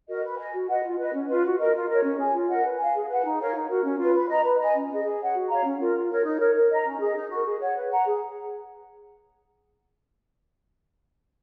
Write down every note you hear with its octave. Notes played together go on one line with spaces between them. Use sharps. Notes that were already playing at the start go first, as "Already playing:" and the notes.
F#4 A#4 D#5
B4
D#5 G#5
F#4
B4 D#5 F#5
F4
B4 D#5
C#4
F4 B4
F#4
A#4 D#5
F4
A#4 C#5
C#4
G#4 C#5 G#5
F4
A#4 D#5 F#5
B4
F5 G#5
G#4
B4 F#5
D#4
A#4 C#5 F5
D#4
F#4 A#4
C#4
F4 B4
B4
D#5 A#5
B4
D#5 G#5
C#4
G#4 D#5
G#4
C#5 F#5
F#4
C#5 F5 A#5
C#4
F4 A#4
F4
A#4 C#5
D#4
A#4 C#5
A#4
D#5 A#5
C#4
G#4 D#5
D#4
F#4 A#4
G#4
C#5 F#5
B4
F#5 A#5
G#4